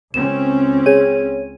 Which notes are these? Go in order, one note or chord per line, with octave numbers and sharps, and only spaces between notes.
C#2 C4 C#4 E7
G#4 C#5 D#7